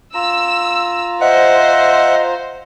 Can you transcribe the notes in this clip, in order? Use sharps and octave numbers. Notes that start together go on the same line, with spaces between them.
F4 A#5 E6
C5 D#5 E5 F#5